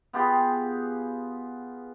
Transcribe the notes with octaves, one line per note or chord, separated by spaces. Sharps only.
B3 F4 G4 G#4